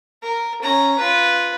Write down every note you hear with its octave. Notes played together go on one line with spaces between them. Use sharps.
A#4
C#4 A#5
F4 B4